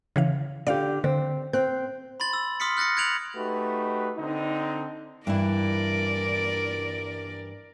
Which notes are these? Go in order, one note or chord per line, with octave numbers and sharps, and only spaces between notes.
C#3 E3 F5
D3 G4 D5 F5
D3 C4
C4 F#6
B5 C6 A6 F#7
E6
C6 D#6 F6 B6 C#7
F6 F#6 A6 A#6 C#7
F#6 G#6 D7 F7 F#7
A3 D#4 F#4 G4 B4
D3 C4 D#4
G2 E3 E4 A#4 D5